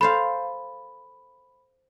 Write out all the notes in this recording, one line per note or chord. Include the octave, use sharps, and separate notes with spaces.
A4 C5 F5 B5